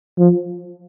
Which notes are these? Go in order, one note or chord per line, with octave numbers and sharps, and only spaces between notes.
F3